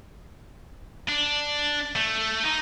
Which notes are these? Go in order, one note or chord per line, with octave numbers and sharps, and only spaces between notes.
D4
A3
D#4